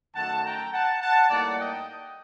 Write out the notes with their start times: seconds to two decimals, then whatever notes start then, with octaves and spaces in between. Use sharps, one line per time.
0.15 F#2 D#3 A3 F#5 A5
0.44 G5 A#5
0.73 F#5 A5
1.02 F#5 A5
1.30 A2 G3 A#3 D#4 D5 F#5
1.59 D#5 G5